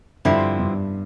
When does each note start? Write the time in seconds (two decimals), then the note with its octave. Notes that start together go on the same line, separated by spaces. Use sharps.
0.25 G2 D3 F3 C4 E4
0.59 G2